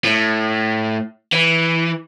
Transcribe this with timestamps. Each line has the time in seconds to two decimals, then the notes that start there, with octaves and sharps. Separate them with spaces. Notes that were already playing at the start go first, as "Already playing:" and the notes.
0.05 A2
1.33 E3